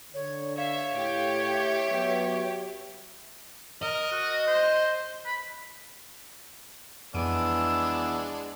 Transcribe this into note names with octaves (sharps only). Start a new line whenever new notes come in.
D3 C#5
C#5 E5 F5
A2 G4
E5
F#3 B3
A#4 D#5
F#4
C5
B5
F2 E3 G#3 B3 D4 E6 D7 D#7